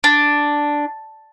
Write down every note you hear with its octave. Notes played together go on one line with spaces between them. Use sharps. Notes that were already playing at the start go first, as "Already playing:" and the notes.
D4